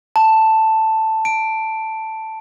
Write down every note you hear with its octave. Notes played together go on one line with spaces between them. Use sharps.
A5
D7